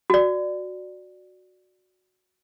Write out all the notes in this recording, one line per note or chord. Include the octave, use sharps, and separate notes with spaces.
F#4 D5